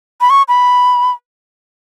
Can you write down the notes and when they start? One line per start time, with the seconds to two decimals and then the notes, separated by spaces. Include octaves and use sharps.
0.21 B5
0.30 C#6
0.48 B5